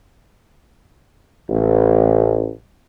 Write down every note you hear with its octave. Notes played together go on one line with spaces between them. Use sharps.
A1